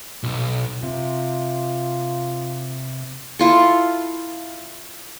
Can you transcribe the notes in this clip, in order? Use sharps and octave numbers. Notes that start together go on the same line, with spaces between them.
B1
C3 F4
E4 F4 A4